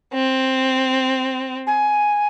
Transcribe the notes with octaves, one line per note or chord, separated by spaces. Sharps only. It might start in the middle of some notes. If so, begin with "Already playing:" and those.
C4
G#5